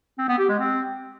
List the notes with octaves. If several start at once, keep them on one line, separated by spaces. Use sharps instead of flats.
C4
B3
G4
G#3
C4